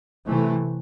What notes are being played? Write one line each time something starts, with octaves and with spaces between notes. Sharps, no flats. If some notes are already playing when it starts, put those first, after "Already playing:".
C3 E3 A3